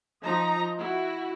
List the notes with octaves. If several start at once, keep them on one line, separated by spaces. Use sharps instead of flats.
F3 D#4 D#5 A#5
E4 F#4